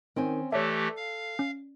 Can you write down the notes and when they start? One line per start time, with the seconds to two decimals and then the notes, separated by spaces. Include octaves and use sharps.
0.16 D#3 C4 C#4 G#5
0.52 E3 A3 G4 A4 C#5 D5 E5
0.97 F5
1.39 C#4